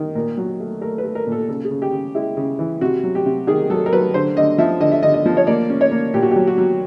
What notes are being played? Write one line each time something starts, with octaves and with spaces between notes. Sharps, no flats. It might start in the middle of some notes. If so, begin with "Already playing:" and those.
Already playing: D#3
A#2 A#4
F#3
A3
A3 A#4
B4
A3
A#4
A#2 A4
C#3 A4
G#4
C#3
G4
C#3
G#3 E4
C#3
E3
C3 F#4
F#3
G4
C3
D#3 G#4
F#3 A4
A#4
F#3 B4
D3 C5
D3 D#5
F3 E5
D3 D#5
E5
D3 D#5
D#5
F3
C#5
A#3 D5
C#4
C#5
A#3
A#2 G4
F#4
G4
F#3
F#4
F#3